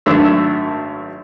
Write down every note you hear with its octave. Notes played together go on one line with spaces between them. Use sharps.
G#1 F#2 A3 D4 E6